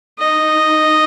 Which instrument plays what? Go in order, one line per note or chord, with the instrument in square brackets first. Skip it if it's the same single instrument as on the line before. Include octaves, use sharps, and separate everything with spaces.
[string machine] D#4 [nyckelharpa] D#5